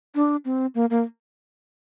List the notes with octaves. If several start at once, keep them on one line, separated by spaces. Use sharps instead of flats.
D4
C4
A#3
A#3